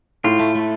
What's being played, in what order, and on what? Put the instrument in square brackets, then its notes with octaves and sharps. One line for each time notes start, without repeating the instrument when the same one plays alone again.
[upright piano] A2 [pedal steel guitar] F4
[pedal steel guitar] A3
A3